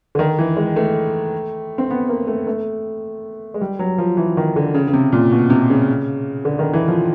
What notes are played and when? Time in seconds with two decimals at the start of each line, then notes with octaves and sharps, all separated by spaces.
0.15 D3
0.19 D#3
0.38 E3
0.57 G#3
0.76 A3
1.78 C4
1.91 B3
2.09 A#3
2.27 A3
2.47 A3
3.54 G#3
3.61 G3
3.79 F#3
3.98 F3
4.17 E3
4.37 D#3
4.56 D3
4.74 C#3
4.87 C#3
4.94 C3
5.12 A#2
5.32 B2
5.50 C3
5.70 C#3
6.45 D3
6.59 D#3
6.73 E3
6.88 F3